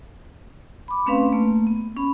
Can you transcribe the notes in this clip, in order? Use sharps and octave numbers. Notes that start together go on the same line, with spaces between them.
B5 D6
A3 C4 C#4 B4 F5 C6
A3 A#3
B3
C#4 B5